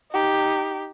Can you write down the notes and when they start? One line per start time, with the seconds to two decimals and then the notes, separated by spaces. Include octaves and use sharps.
0.11 D#4 G4